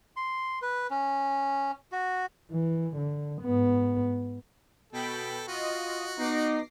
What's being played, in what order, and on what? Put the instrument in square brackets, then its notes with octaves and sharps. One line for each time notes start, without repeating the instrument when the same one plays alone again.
[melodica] C6
B4
C#4
F#4
[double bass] E3
D3
G#2 B3
[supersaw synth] B2 G5 B5 [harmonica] A4
[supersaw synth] F4 D#5 [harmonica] F#4
[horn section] B3 D#4 [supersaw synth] D6 A#6 C7